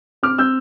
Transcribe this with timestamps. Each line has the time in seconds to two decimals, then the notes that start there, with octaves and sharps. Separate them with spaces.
0.23 C4 D6 F6
0.38 C4 E6 G6